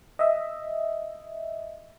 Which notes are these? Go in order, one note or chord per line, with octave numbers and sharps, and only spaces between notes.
D#5 E5